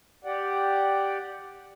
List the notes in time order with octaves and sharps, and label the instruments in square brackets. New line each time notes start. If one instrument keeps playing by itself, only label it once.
[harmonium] G4 D5 F#5